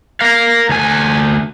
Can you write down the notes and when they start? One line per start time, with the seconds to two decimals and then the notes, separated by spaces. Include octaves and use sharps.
0.21 A#4 F5
0.69 D2 G#5